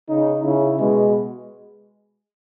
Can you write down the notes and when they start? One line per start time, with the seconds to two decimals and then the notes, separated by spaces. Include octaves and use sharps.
0.09 C#3 D#4
0.44 C#3 E4
0.79 B2 G#3